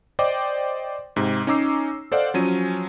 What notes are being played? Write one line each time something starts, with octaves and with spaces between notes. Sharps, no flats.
C5 D5 D#5 G5 D6
G#2 C3
C#4 D#4 A#5 D6 E6 C7
A4 C5 D5 D#5 F5 F#5
F3 F#3 C#4 D#7